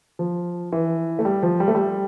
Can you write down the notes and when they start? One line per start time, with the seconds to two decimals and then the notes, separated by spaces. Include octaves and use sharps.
0.19 F3
0.72 E3
1.19 A3
1.25 G3
1.43 F3
1.60 G3
1.68 A3
1.75 G3